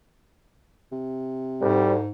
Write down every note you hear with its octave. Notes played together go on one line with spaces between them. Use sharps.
C3
D2 G#2 G3